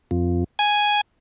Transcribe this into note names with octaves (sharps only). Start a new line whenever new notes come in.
F2
G#5